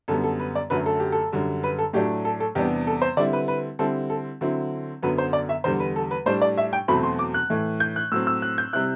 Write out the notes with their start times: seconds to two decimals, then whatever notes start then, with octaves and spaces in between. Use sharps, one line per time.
0.08 F#2 D3 G3 B3 A4
0.24 A4
0.40 B4
0.55 D5
0.70 F#2 D3 F#3 A3 B4
0.86 A4
1.00 G4
1.12 A4
1.32 F#2 D3 G3
1.64 B4
1.79 A4
1.93 A2 F#3 A3 D4 G4
2.25 A4
2.40 A4
2.55 E2 C3 G3 B3 D4 G4
2.87 A4
3.02 C5
3.17 D3 G3 C4 E4 D5
3.33 B4
3.48 B4
3.79 D3 G3 C4 E4 A4
4.10 A4
4.41 D3 F#3 C4 E4
5.03 F#2 D3 F#3 B3 B4
5.18 C5
5.33 D5
5.49 E5
5.64 E2 D3 G3 C5
5.80 B4
5.96 A4
6.11 B4
6.26 A2 G3 D4 C5
6.42 D5
6.58 E5
6.73 G5
6.88 E2 B2 F#3 A3 C4 B5
7.03 C6
7.19 D6
7.34 F#6
7.50 A2 E3 A3
7.80 G6
7.96 F#6
8.12 A2 F#3 C4 E6
8.27 E6
8.42 F#6
8.58 G6
8.73 C3 G3 C4 E4 F#6